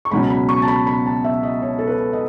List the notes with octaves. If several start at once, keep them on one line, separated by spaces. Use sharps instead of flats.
C#6
C#2 B2 F#3 C#4 B5
B5
C#6
A5
B5
B5
A5
E5
D#5
C#5
A4
B4
D#5